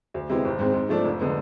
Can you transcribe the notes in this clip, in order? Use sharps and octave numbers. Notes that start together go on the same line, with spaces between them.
D2
C3 G#3 B3 E4
G#1
G#2 G#3 C4
G#2
F3 A3 D4
F1
D3 G#3 B3